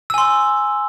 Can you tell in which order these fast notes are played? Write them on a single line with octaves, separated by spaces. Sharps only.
E6 G#5 C6